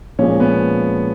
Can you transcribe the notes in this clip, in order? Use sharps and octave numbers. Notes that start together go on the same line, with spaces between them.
A#2 F3 G#3 C#4
B3